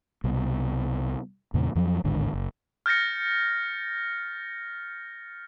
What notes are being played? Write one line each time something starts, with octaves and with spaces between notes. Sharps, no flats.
C2 B2
E2 G2 A#2 C#3
F2 F3 F#3
A1 D#2 G#2 D3
F#1
F6 G6 A6 A#6 C#7